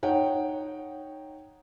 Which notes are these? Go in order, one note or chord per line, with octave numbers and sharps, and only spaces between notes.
D#4 C#5 F#5 G5